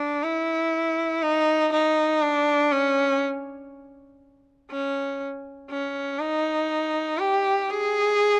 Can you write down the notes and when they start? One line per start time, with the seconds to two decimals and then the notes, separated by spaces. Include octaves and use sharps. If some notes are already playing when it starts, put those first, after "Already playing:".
Already playing: D4
0.23 E4
1.23 D#4
1.73 D#4
2.22 D4
2.72 C#4
4.71 C#4
5.70 C#4
6.20 D#4
7.19 G4
7.70 G#4